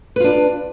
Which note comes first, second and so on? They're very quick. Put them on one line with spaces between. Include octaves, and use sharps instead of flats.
B4 F4 D4